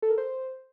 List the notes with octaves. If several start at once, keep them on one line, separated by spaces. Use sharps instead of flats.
A4
A#4
C5